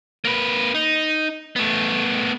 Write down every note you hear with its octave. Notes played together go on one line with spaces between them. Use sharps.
A#3 B4
D#4
A3 B3